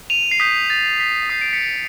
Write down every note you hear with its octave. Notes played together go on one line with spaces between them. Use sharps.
D#7 F7
C7
D#6 G6 B6
A6
B6
D#6 G6 C7
D7
B6 C#7